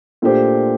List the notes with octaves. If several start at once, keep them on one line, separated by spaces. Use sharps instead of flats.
A#2 A3 D4 G4 C5